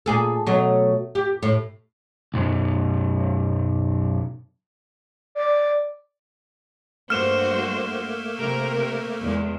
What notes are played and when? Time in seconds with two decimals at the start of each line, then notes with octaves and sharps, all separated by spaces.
0.06 A#2 G#4 A4
0.46 B2 F#3 A3
1.15 G4
1.43 A2
2.34 B1 F#2
5.35 D5
7.10 G2 A3 A#3 F#4 C5 F6 E7
8.38 C3 A#4
9.20 E2 G#3